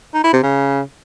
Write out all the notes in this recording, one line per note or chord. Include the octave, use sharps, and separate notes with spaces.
D#4
E4
C3
C#3